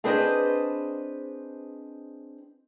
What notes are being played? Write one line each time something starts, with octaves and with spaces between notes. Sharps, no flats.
C4 D4 G#4 B4 C5 D#5